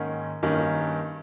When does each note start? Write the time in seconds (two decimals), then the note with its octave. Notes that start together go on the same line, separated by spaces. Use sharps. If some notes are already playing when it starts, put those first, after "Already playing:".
Already playing: G#2 D#3 A#3 C#4
0.43 G2 D#3 A#3 C#4